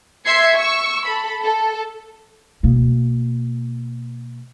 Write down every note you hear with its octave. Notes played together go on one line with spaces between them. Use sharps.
E5 C6 E6 G#6 C7 C#7
C#6 E6
A4 B5
A4
B2 A#3